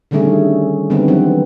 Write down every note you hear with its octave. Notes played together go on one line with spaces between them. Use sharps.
D3 D#3 G3 A3 C#4 G#4
D3 D#3 G3 B3 C4
E3 F#3 C4